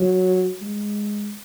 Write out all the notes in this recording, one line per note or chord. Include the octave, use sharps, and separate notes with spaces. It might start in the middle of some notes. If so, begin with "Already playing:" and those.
Already playing: F#3
G#3